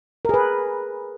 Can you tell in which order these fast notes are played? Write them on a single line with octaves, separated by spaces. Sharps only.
A#4 G#4 B4